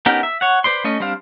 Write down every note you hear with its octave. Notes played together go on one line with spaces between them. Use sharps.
B3 C#4 D#4 G4 A#4
E5
C#5 F#5
B4 C5 D5 C6
A3 C#4 D#5
G3 C4 D4 C5 F5